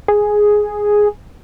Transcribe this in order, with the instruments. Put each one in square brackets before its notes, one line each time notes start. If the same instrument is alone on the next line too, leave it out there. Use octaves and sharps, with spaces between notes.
[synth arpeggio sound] G#4